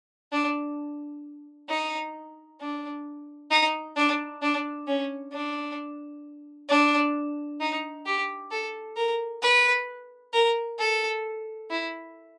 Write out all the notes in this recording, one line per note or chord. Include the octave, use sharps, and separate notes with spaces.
D4
D#4
D4
D#4
D4
D4
C#4
D4
D4
D#4
G4
A4
A#4
B4
A#4
A4
E4